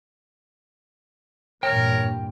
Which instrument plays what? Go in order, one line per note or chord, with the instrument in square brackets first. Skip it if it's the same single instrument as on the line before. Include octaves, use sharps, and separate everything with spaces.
[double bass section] E2 G2 A#2 [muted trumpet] A#4 [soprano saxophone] C#5 [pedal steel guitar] G5 F6